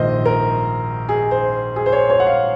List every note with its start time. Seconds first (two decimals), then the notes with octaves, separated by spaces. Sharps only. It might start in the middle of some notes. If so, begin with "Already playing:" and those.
Already playing: A#1 G#2 D#3 C5 D#5
0.26 A#4
1.09 G#4
1.31 C5
1.76 G#4
1.86 C5
1.92 C#5
2.10 C#5
2.20 F#5
2.27 F5